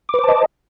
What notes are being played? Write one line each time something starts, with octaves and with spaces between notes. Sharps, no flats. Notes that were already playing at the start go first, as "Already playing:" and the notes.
B4 C5 D#5 A5 D6